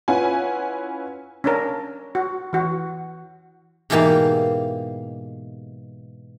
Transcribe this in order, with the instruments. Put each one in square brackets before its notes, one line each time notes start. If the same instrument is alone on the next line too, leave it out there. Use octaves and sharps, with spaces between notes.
[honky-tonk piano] C#4 E4 F4 B4 F#5 G#5
[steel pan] C#4 D4 A#4
F#4
E3 F#4
[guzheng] G#2 B2 E3 A#3 G4 F5